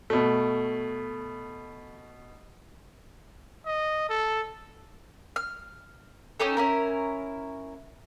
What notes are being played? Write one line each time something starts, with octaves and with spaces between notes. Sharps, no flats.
B2 A3
D#5
A4
F6
C#4 D#4 G4 A4
C#4 E4 A#4